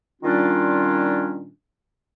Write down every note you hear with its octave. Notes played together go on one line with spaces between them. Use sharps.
A#2 D#3 G3 C#4 D4 F4